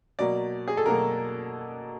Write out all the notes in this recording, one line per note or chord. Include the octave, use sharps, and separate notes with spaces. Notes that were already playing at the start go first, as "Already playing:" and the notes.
B2 F#3 A#3 D5
G#4
A4
B2 F#3 A#3 A#4